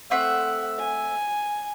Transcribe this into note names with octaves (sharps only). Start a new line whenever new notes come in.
A3 C4 E5 F#5
G#5